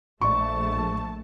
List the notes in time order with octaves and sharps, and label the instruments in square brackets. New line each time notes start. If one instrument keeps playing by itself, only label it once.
[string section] A#1 A3 A5 [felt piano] D5 C#6